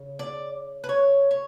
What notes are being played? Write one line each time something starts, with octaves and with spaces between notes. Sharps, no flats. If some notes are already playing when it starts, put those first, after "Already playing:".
Already playing: C#3
D5
B4
C#5
C#5